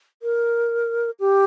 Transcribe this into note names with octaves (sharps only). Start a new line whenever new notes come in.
A#4
G4